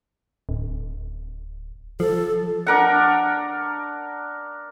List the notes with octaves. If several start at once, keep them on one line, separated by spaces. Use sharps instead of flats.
D1
F3 A4
D4 A#4 F#5